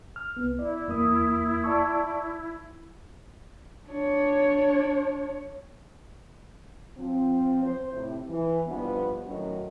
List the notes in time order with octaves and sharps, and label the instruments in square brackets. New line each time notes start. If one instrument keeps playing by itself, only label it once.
[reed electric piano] F6
C2 B3
[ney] E4 [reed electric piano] D5
[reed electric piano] E2 A#3 D#6
D5 A5 C#6
[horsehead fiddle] D4 C#5
[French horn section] F3 C4
C5
A2 C3 E4
E3
G2 B2 F3 B3
A2 D#3 F#3 C#4 D#4 F#4